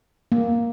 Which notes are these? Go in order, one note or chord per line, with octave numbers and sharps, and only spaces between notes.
A#3